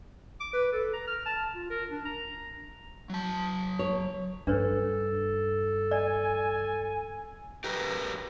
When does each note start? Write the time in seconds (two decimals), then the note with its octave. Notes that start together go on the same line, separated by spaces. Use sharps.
0.40 D6
0.53 B4
0.73 A4
0.93 A#5
1.07 F6
1.26 A5
1.54 F4
1.70 A#4
1.90 D4
2.05 A#5
3.10 F#3 A5
3.79 C#5
4.47 G2 D4 A4 B4 C#5
5.91 D5 G#5
7.64 G4 A#4 B4